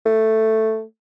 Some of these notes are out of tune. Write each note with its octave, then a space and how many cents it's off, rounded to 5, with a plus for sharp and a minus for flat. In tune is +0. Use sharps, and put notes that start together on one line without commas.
A3 +5